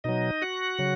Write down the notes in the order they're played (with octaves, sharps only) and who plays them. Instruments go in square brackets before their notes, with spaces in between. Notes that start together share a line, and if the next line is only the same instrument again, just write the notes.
[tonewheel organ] B2 F#3 D#4 D#5
F#4 F#5
C#3 F#3